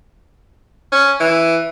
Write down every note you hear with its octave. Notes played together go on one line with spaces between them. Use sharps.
C#4
E3